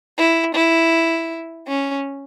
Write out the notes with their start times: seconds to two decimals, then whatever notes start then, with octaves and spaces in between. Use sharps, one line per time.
0.18 E4
0.54 E4
1.68 C#4